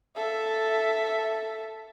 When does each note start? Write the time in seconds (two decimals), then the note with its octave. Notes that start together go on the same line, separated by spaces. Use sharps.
0.17 A4 E5